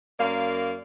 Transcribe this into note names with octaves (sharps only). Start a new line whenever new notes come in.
F#2 A#3 D5 F5